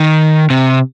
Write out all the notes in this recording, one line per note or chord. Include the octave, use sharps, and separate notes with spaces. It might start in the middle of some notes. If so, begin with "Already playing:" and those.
Already playing: D#3
C3